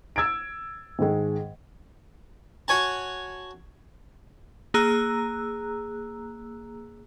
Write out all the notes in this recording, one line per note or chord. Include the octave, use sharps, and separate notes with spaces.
E6 G#6 A6 D7
G#2 D#3 G#3
F#4 C#5 G#5 A5
A#3 G#4 A#5 E6 F#6